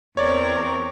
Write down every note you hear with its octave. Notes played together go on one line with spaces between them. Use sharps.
E2 C4 A#4 C#5 D5